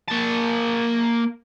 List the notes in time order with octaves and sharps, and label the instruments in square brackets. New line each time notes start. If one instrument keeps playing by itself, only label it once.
[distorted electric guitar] A#3 A5